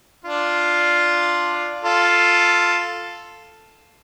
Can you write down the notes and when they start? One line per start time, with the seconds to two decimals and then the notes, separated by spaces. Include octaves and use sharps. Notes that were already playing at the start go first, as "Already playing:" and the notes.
0.25 D4 F4
1.84 F4 A4